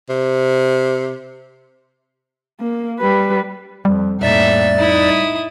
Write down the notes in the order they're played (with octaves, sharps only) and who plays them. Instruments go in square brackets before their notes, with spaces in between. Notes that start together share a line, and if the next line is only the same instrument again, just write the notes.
[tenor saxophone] C3
[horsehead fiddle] A#3
G3 B4
[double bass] F2 [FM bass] G3
[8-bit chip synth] F2 D5 A6 [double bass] A2 A#3 [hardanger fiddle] D#4 E5
[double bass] D#4 [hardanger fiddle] E4 D#6